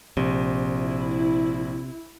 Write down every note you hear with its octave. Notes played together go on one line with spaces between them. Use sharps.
A#1 C3
E4